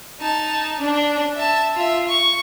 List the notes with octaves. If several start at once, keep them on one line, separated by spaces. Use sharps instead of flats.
D#4 A5
D4
E5 A5
F4 E5
C#6